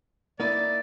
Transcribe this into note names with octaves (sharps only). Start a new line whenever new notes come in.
A#3 D#4 E4 D5